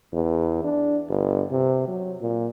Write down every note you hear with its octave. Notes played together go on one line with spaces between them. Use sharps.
E2
D4
G1
C3
F#3
A#2